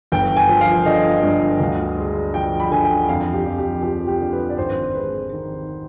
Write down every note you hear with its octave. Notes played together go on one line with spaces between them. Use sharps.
G1 G5
G#5
F3
F5
D3 D#5
G2
D2
G#3
F3 G5
B5
D3 G#5
G5
F2 F5
G4
F2
G4
F3 G4
G4
D3
B4
D5
G#1 C5
G#3 B4
D#3